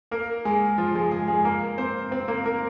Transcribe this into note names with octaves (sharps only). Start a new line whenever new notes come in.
A#3 A#4
G#3 G#4
F3 F4
G#3 G#4
G#3 G#4
G#3 G#4
A#3 A#4
C4 C5
C4 C5
A#3 A#4
A#3 A#4